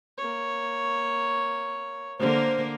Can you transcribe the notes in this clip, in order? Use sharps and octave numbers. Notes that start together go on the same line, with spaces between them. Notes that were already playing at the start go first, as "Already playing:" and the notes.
A#3 C#5
D3 A#3 A#4 C5